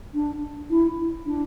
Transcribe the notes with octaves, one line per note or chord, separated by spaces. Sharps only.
D4
E4
D4